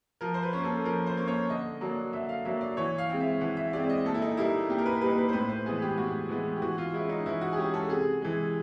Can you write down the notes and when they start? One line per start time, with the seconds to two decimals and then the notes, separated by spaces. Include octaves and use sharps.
0.21 F3 A#4
0.34 C5
0.43 B4
0.53 A#3 C#4
0.64 A4
0.85 F3 A#4
1.07 C5
1.17 A#3 C#4
1.28 C#5
1.50 D3 D#5
1.81 F#3 A#3 D4
2.13 D3 E5
2.29 F5
2.45 F#3 A#3 D4 E5
2.61 D5
2.77 E3 C#5
2.98 F5
3.10 G#3 C4
3.20 E5
3.41 E3 F#5
3.57 E5
3.73 G#3 C4 D5
3.84 D5
3.89 D#5
4.05 A#2 A4
4.14 E4
4.22 D#4
4.37 G3 A#3 D#4 E4
4.69 A#2 G4
4.78 A#4
4.86 B4
5.01 G3 A#3 D#4 B4
5.18 B4
5.29 C5
5.33 A2 B4
5.49 C5
5.66 E3 G#3 B3 G#4
5.82 G4
5.97 A2 F#4
6.29 E3 G#3 B3
6.56 G4
6.62 E3 F#4
6.78 F4
6.94 G#3 C#4 E4
7.09 D#4
7.26 E3 E4
7.41 F#4
7.53 G#4
7.57 G#3 C#4 G4
7.74 A4
7.90 C3 G#4
8.22 E3 G#3